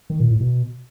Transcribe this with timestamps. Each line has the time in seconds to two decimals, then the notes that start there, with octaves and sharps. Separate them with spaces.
0.10 D#3
0.20 A#2
0.30 A2
0.41 B2